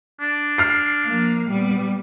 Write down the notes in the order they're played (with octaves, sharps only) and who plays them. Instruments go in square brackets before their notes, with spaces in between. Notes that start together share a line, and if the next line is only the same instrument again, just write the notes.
[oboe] D4
[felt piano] F6 C7
[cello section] F3 A#3 F5
A#2 G3 B3